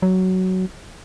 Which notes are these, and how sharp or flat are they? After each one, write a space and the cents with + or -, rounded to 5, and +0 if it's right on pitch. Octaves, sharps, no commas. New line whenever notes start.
F#3 +10